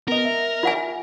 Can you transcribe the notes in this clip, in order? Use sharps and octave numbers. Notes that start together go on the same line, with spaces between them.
B3 A#4 D#5
E5
F4 F#5 G#5